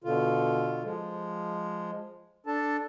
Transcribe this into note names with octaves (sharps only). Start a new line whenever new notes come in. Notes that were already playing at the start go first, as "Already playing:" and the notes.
B2 D3 F4
F3 G#3
D4 A4 A5